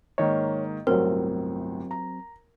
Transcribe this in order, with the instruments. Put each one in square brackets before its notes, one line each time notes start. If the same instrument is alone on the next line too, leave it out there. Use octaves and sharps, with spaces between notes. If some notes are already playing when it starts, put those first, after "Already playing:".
[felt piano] G#2 D#3 A#3 [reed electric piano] C#5 [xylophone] D#5
[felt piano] G1 C2 A2 [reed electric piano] F#3 C4 [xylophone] A#4
[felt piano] A#5